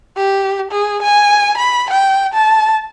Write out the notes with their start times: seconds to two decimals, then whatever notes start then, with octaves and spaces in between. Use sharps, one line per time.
0.17 G4
0.71 G#4
1.02 G#5
1.58 B5
1.90 G5
2.34 A5